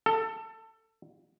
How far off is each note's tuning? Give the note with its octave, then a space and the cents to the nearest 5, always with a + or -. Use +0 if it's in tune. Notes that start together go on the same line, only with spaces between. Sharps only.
A4 +20